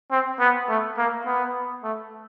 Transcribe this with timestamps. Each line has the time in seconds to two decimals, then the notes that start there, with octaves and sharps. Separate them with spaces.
0.11 C4
0.40 B3
0.69 A3
0.97 A#3
1.26 B3
1.84 A3